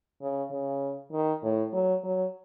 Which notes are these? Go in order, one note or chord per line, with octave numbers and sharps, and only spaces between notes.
C#3
C#3
D#3
A2
F#3
F#3